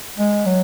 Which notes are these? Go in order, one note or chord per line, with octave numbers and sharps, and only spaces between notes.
G#3
F#3